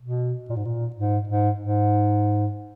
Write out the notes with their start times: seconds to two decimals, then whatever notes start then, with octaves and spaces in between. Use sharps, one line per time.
0.02 B2
0.50 A#2
0.57 G#2
0.65 A#2
0.96 G#2
1.28 G#2
1.59 G#2